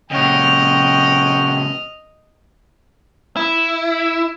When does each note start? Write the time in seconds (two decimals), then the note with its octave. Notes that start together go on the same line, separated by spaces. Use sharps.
0.11 A#2 C#3 C#5 D#5 F#5 G5 F6
3.36 E4